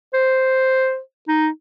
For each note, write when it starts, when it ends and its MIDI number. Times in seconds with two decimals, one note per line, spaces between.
0.14 0.99 72
1.28 1.48 63